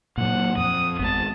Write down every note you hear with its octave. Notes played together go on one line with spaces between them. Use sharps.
A#2 F#3 F#5
F2 D#6
G#1 G#2 B3 A5